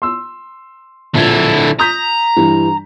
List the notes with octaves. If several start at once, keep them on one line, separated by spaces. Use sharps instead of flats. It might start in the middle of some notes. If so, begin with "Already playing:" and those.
C6 E6
A#1 D3 E4 G#6
A#5 D#6 G6 B6
G2 E3